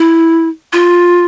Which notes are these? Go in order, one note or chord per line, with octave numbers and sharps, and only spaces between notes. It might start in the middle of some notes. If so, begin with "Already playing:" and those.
Already playing: E4
F4